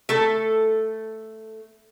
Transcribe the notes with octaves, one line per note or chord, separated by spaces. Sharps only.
A3 A4